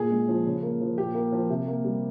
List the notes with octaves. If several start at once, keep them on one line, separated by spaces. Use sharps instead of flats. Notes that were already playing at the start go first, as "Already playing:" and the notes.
Already playing: A#2 G#4
G#3
F3
C#3
A#3
F3
A#2 G4
A#3
F3
C3
A#3
G3